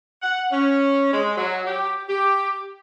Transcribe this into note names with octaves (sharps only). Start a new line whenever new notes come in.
F#5
C#4
G#3
F#3
G4
G4